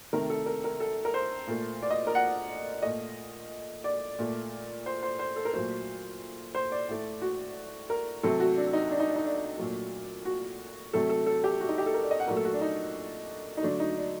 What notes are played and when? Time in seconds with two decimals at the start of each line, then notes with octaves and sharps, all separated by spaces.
0.13 C3 D#3 A3 A#4
0.30 A4
0.46 A#4
0.64 A#4
0.80 A4
1.05 A#4
1.14 C5
1.47 A#2 A3
1.82 D5
1.91 D#5
2.07 A#4
2.15 F#5
2.82 A#2 A3 D#5
3.84 D5
4.19 A#2 A3
4.86 C5
5.03 C5
5.19 C5
5.36 A4
5.45 A#4
5.53 A#2 F#3 A3 C5
6.55 C5
6.72 D5
6.88 A2 A3
7.22 F#4
7.90 A#4
8.23 C3 F#3 A3 A4
8.40 F#4
8.57 D4
8.73 D#4
8.91 D4
9.00 D#4
9.08 D4
9.16 D#4
9.25 D4
9.58 A#2 F#3 A3
10.25 F#4
10.93 C3 F#3 A3 A4
11.09 A4
11.26 A4
11.44 G4
11.60 F#4
11.68 D#4
11.78 G4
11.86 A4
11.94 A#4
12.03 D5
12.11 D#5
12.20 F#5
12.28 A#2 F#3 A3 A#4
12.36 A4
12.45 F#4
12.53 D4
12.61 D#4
13.57 D#4
13.63 D3 F#3 A3 D4
13.80 D#4
13.97 D4